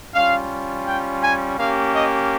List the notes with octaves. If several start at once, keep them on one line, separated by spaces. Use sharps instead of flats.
G3 C#4 F4 F5
G5
G#5
A#3 C#4 G4 F5
D#5